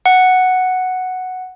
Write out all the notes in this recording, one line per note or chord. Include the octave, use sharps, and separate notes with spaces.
F#5